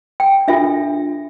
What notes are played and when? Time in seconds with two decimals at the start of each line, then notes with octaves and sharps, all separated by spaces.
0.20 G5
0.48 D4 F4 A4 E5